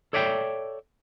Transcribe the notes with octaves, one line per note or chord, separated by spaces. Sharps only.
A4 C#5 D5 E5 F5 G5